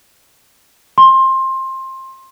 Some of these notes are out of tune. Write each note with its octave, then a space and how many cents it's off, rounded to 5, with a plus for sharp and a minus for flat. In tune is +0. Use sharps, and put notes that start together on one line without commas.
C6 +20